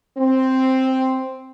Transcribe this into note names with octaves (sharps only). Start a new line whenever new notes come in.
C4